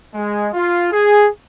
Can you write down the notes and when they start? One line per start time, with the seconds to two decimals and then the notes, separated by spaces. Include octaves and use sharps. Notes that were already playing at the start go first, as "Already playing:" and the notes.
0.13 G#3
0.53 F4
0.92 G#4